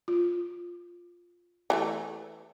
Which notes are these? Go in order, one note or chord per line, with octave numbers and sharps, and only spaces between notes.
F4
E3 G3 A3